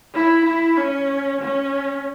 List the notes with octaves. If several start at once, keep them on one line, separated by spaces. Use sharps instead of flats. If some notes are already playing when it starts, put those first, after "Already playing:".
E4
E4
C#4
C#4